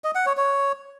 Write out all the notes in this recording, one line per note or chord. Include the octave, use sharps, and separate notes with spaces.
D#5
F#5
C#5
C#5